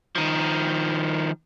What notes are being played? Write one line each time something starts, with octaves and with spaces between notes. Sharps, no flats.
D#3 F3